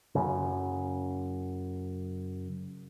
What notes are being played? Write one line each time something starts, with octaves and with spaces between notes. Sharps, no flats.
F#2 C#3